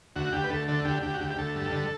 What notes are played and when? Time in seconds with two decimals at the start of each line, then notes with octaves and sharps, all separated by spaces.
0.16 D2 F#4
0.32 D2 G4
0.44 B4
0.50 D2 A4
0.68 D3 A4
0.85 D2 G4
1.02 D2 G4
1.14 F#4
1.21 D2 G4
1.31 G4
1.37 D2 A4
1.55 G2
1.72 D3